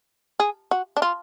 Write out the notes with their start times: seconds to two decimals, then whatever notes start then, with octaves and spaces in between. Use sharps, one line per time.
0.40 G#4
0.71 F#4
0.97 D4
1.02 F4